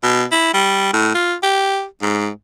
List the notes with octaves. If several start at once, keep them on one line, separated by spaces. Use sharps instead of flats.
B2
E4
G3
A2
F4
G4
G#2